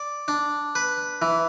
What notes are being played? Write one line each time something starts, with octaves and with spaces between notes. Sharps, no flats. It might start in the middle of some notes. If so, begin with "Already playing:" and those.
Already playing: D5
D4
B4
E3